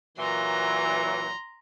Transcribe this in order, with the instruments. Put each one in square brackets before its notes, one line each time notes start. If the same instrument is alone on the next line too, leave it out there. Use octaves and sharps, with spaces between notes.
[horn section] A#2 E3 F#3 [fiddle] A#5 C6